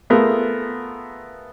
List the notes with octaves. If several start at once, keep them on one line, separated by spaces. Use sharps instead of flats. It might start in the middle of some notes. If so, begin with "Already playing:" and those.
A3 B3 F4 G#4 A#4